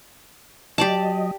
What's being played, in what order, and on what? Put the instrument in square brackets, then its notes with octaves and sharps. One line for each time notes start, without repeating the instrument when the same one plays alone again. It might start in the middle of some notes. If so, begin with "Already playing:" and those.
[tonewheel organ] F#3 D#5 [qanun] G4 D5 A5